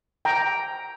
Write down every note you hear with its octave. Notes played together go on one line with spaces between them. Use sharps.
G5 A#5